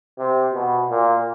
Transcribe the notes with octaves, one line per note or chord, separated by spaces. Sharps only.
C3
B2
A#2